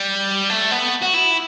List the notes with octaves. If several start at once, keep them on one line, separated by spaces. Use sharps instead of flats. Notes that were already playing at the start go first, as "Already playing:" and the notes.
Already playing: G3
A3
B3
F#4
E4